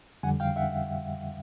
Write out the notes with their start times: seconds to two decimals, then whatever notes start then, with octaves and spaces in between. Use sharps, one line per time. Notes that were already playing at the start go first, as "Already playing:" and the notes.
0.23 F2 D3 G3 F#5 G#5
0.40 F5 G5
0.56 E5 F#5